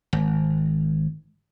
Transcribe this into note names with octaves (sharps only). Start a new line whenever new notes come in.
G#1